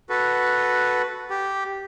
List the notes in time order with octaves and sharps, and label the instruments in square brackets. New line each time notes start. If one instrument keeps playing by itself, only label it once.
[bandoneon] F#4 A4 B4
G4